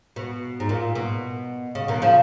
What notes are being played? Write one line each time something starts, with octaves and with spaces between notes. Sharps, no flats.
B2
G#2
A#2
B2
C#3
B2 D#3
C#3 F3